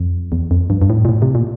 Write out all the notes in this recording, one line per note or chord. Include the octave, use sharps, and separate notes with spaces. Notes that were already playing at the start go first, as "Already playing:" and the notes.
Already playing: F2
E2
F2
G2
G2
A2
A#2
A2
C3
A#2